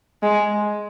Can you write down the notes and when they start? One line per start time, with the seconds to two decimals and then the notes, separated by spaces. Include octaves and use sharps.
0.23 G#3